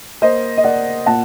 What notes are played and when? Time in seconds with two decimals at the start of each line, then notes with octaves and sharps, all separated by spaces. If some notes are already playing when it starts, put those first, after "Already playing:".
0.22 A#3 C5 D#5
0.57 D#5
0.64 A#3 D5 F#5
1.06 A#2 F#5 A5